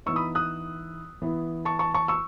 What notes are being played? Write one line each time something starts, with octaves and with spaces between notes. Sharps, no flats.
E3 B3 D#4 C#6 E6
B5 D#6
D#6 F#6
E3 B3 E4
A5 C#6
A5 C#6
A5 C#6
C#6 E6